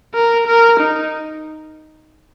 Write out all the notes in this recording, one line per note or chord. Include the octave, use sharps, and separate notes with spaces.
A#4
A#4
D#4